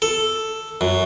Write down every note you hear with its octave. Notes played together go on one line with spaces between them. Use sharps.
A4
F#2